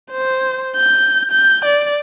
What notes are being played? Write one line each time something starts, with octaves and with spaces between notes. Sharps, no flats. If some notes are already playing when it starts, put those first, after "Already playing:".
C5
G6
G6
D5